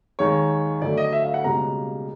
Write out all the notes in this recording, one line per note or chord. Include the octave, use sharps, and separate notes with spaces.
D#2 D#3 G#3 C#5
D2 D3 F#3 A3 D5
D#5
E5
F5
F#5
C#2 B2 G3 A#3 A#5